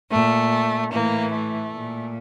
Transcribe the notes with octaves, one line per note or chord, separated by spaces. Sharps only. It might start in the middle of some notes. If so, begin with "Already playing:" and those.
A#2 A3
A2 E3 A#3
A3
A#2